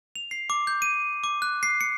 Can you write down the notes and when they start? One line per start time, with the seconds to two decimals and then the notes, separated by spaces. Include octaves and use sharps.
0.16 F7
0.31 C7
0.50 D6
0.67 G6
0.82 D#7
1.24 D6
1.42 F#6
1.63 C7
1.81 C#7